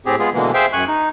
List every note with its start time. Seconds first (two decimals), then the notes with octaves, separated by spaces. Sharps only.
0.06 A2 C4 G4 G#4
0.19 G#3 B3 F4 G#4
0.34 B2 D3 E3 G#3 A#3
0.54 G#4 C5 E5 F5 G5
0.73 F#2 G#5 C#6 F#6
0.88 D#4